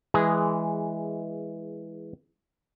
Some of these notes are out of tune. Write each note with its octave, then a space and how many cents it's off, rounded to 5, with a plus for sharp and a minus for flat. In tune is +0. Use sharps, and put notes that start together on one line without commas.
E3 +0 G#3 +0 G#4 -10